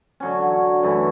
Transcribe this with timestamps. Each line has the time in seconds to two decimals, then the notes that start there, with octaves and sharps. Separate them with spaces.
0.20 D3 F#3 C#4
0.83 F#2 E3 A3